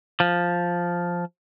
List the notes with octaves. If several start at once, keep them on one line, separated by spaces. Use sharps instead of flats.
F3